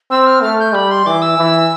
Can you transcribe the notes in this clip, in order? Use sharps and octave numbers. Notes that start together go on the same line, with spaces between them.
C4 E6
F6
A3 F6
G6
G3 B5
C6
E3 D6
E6
E3